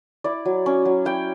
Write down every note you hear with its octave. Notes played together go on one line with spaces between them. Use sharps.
E4 D5
F#3
C#4
F#3
E4 G5